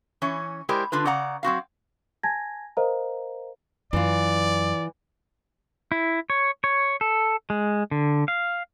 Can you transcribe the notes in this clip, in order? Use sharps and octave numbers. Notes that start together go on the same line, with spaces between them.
E3 C#4 C#5
G#3 E4 G4 A#4 C5 D5
D3 D4 F4 B4
C#3 D5 F#5 A#5
F#3 C4 F#4 F5
G#5 A5 G#6 A#6
A#4 C5 D#5 F5 A#5
F#2 E3 F4 D5
E4
C#5
C#5
A4
G#3
D3
F5